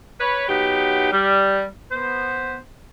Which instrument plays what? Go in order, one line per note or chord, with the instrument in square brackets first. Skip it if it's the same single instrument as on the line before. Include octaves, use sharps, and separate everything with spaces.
[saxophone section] B4 C#5
F#3 B3 D#4 G4
G3
B3 C5